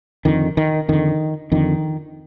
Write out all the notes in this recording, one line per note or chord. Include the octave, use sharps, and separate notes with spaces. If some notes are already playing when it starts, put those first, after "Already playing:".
F2 D3 D#3
D#3
F2 D3 D#3
F2 D3 D#3